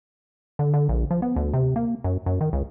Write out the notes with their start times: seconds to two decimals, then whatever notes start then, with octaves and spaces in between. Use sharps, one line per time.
0.59 D3
0.74 D3
0.89 A#1
1.11 F3
1.22 B3
1.36 D2
1.54 C3
1.76 A#3
2.04 F#2
2.26 F#2
2.41 D#3
2.53 C#2